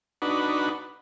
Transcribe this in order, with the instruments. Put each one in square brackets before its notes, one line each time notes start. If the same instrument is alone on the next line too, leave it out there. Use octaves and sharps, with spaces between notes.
[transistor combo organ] D4 D#4 F#4 B4